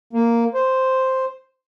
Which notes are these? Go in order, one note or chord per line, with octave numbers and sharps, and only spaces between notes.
A#3
C5